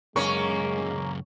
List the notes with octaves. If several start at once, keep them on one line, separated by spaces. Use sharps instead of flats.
C#2 F#2 G#3 A#3 C#4 C#6